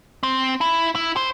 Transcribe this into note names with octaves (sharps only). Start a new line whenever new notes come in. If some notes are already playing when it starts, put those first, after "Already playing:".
C4
E4
E4
C5